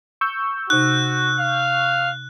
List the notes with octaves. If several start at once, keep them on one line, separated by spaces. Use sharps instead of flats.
C#6 E6 G6
C3 D#4 F#4 F#6
F5